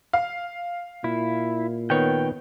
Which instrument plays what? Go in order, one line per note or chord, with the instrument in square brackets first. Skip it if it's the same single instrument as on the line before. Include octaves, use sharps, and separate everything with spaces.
[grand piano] F5
[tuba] A#2 [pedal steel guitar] E4
[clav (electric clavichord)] D#3 B3 C#5 [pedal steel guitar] G5